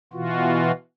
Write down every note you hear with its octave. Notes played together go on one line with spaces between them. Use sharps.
B2 E3 F4 F#4